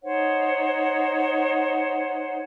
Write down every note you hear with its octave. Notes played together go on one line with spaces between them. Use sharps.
D#4 C5 C#5 F#5